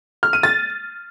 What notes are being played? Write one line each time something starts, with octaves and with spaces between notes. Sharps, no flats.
F6
D#7
A6